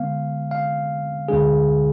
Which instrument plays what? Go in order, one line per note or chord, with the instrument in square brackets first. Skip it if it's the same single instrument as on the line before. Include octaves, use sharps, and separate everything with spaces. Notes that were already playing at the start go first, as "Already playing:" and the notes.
Already playing: [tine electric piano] D3 G#3 B3 F5
F5
D2 D3 G#3 D4 G#4